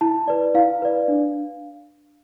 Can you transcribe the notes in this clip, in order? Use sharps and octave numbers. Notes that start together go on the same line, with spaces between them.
E4 A5
B4 D5
E4 F5
B4 D5
D4